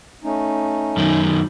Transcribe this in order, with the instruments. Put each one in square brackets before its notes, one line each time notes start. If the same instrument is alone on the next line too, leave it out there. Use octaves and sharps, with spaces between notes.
[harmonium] A3 C#4 D#4
[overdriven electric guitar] F#2 D#3